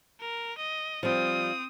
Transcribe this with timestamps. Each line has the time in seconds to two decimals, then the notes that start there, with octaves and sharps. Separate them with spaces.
0.20 A#4
0.58 D#5
1.03 F3 G3 C4 D#6